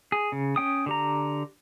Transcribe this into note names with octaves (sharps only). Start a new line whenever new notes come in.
G#4
C#3
C#4 G5 D#6
D3 G4 A#5